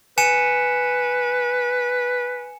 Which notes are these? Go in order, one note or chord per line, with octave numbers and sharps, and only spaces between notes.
B4 G#5 C#7 E7